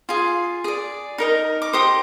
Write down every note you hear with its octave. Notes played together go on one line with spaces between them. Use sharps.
F4 G#4
G#4 D5
D#4 A#4 D#5
D6
D#4 G4 C5 D#6